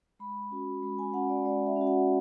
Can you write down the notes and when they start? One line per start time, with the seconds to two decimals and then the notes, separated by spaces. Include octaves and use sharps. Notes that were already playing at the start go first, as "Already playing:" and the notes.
0.19 G#3 B5
0.51 C#4 F#4
0.83 G#3 B5
0.99 G#5
1.14 C#4 F#4 F#5
1.29 D5
1.45 G#3 D5
1.67 E5
1.76 C#4 F#4
1.87 F#5